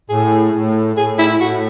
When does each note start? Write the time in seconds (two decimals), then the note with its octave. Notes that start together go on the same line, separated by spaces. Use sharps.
0.09 A2 G#4
0.54 A2
0.97 A2 G#4
1.19 E4
1.40 A2 F#4